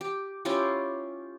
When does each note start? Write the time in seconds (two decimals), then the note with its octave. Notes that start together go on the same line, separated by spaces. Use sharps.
0.01 G4
0.45 C#4 E4 F4 G4